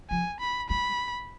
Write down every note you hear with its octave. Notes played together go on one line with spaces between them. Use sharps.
F3 G#5
B5
G3 B5